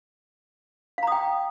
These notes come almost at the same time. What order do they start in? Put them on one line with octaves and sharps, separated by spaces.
F5 A#5 D#6 G5